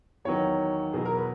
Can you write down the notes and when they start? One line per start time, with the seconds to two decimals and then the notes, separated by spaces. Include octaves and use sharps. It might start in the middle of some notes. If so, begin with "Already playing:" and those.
0.25 E2 D#3 F#3 C#5
0.93 E2 B2 F#3 G#4
1.05 A#4
1.17 B4